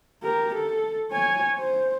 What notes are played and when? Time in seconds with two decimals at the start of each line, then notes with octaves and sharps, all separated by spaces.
0.23 G4 A#4
0.55 A4
1.12 C#5 G#5
1.58 C5